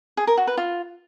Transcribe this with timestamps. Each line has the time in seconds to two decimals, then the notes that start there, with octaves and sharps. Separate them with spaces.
0.17 G#4
0.27 A#4
0.37 F#4
0.47 B4
0.57 F4